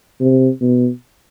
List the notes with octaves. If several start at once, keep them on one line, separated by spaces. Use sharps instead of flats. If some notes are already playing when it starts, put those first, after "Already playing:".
C3
B2